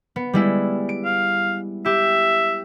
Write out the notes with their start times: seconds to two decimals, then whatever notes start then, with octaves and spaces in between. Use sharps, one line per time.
0.16 B3
0.33 G3 G#3 E4
0.89 D7
1.05 F5
1.86 G4 E5